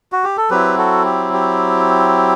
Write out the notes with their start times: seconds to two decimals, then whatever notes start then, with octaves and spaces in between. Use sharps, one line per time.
0.12 F#4
0.24 G4
0.37 A4
0.50 F#3 C4 E4 G4 B4
0.78 F#4 A4
1.05 G4
1.33 G4